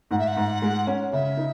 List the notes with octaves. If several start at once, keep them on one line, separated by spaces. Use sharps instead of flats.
G#2 F#5
E5
F#5
G#2
G#3
C#4
C#3 E5
D#4